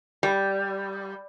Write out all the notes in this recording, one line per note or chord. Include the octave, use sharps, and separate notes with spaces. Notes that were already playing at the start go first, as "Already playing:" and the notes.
G3